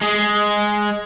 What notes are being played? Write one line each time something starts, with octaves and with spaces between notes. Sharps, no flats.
G#3 G#4